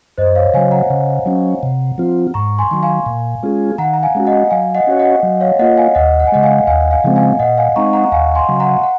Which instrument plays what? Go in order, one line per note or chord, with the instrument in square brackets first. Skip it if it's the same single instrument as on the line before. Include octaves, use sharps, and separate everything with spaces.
[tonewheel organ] F#2 [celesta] C5 D#5
[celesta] C#5 F5
[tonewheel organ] C#3 F#3 [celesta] F5 G#5
[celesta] F#5 A#5
[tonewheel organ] C#3
F#3 C#4
C3
F3 C4 F4
[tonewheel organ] G#2 [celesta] A#5 C#6
[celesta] G#5 C6
[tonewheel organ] D#3 F#3
[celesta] F5 G#5
[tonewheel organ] A#2
G#3 C#4 F4 G#4
[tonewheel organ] D#3 [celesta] F#5 A#5
[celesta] A#5
F5 G#5
[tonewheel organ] G#3 C#4 F#4
[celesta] D#5 F#5
[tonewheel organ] F#3 [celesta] F5 G#5
[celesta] D#5 F#5
[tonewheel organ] C#4 F#4 C#5
[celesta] D#5 F#5
[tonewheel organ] F#3
[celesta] C#5 F5
[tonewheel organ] A#3 F4 [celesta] D#5 F#5
[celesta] F5 G#5
[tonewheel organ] D#2 [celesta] D#5 F#5
[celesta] F#5
G#5
[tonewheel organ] C#3 G#3 [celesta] D#5 F#5
[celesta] F5 G#5
[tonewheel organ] D#2 [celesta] F5 G#5
[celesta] F5 G#5
[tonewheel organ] C#3 F3 G#3 C4
[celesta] F5 G#5
[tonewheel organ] A#2 [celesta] D#5 F#5
[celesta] F5 G#5
[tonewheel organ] G#3 C4 D#4 [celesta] A#5 C#6
[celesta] F#5 A#5
A#5
[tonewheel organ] D#2 [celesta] F5 G#5
[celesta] G#5 C6
[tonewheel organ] C#3 F#3
[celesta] F#5 A#5
F#5